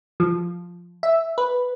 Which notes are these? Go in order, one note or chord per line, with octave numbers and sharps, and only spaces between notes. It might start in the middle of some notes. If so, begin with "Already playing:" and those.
F3
E5
B4